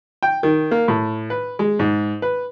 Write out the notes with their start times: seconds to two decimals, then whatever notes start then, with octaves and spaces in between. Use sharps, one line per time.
0.23 G5
0.43 D#3
0.71 A#3
0.88 A2
1.30 B4
1.59 G#3
1.79 G#2
2.22 B4